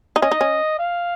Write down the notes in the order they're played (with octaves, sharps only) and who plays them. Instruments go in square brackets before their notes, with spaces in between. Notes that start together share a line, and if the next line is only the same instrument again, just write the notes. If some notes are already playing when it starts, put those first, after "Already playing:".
[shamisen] D#4
[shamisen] C#4 [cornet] D#5
[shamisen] D#4
C#4
[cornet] F5